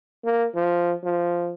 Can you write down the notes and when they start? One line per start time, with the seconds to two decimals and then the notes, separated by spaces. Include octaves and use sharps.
0.25 A#3
0.55 F3
1.04 F3